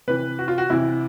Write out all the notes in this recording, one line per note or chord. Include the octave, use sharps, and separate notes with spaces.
C3 E3 B4
F#4
F4
F#4
C3 E3 E4